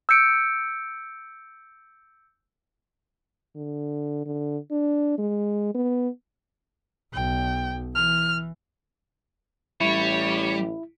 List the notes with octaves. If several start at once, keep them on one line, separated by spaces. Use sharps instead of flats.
E6 G6 C#7 D7
D3
D3
D4
G#3
B3
B1 G5
E3 F6
A1 G3 E4 C#5